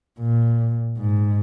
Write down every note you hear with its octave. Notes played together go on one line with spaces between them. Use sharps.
A#2
G#2